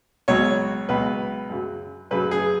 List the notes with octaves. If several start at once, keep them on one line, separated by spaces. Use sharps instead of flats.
C#2 B2 F#3 C#5
C#2 B2 F#3 B4
F#2 C#3 F#3
F#2 C#3 F#3 B4
G#4